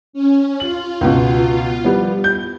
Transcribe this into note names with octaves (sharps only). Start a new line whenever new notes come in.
C#4
F4 F#7
C#2 B2
F3 G3 B3
G6